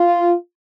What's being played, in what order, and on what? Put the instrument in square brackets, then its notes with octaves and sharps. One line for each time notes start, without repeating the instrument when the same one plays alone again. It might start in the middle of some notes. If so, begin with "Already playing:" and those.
Already playing: [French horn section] F4